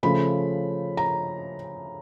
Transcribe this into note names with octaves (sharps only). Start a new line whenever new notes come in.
C#3 F3 A3 B5
A#5